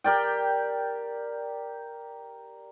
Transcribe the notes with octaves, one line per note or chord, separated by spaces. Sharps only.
G4 A#4 D5 G5